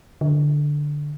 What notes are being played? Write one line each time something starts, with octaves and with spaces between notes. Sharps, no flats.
D3